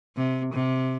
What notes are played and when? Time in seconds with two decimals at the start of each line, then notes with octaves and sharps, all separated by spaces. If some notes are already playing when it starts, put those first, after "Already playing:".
0.16 C3
0.53 C3